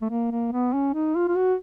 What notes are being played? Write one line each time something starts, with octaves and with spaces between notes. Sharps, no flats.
A3
A#3
A#3
B3
C#4
D#4
F4
F4
F#4